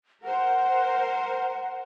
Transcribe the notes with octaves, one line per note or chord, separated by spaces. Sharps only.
A#4 C5 F#5